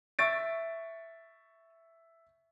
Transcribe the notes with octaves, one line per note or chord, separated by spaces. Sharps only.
E5 C#6 A6 D7